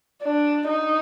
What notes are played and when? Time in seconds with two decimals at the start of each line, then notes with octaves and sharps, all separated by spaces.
0.23 D4
0.68 D#4